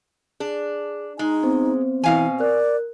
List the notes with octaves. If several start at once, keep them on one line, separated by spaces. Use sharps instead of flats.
D4 G#4
G#3 D#4
B3 C4 C5
B2 E3 F5 G#5
A#4 D5 F#6